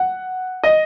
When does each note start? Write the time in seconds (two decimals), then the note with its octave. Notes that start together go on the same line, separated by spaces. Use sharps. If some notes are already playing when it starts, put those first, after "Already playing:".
Already playing: F#5
0.64 D#5